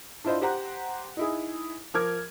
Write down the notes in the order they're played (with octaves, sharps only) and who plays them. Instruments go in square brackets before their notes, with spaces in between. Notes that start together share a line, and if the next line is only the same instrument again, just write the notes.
[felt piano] D4 E4 F4 C5 D#5
G4 C5 F#5 A#5 F#6
D#4 E4 G#4
F3 A#4 D6 F6 G#6